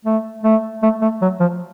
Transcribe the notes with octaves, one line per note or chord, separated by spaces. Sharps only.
A3
A3
A3
A3
F#3
F3